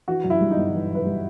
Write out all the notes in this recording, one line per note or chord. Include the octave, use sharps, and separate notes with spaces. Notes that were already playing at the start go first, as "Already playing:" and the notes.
E3 F#4
F#2
E4
G3
D#4
G1
E3
F#2
B4
G3